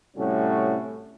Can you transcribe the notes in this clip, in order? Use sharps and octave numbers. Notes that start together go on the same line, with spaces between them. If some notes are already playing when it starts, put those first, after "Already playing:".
A2 C3 G3 A3 C#4 F#4